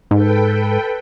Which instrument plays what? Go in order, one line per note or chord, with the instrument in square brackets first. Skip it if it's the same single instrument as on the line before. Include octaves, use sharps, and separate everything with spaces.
[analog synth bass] G#2 [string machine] A4 B4 G5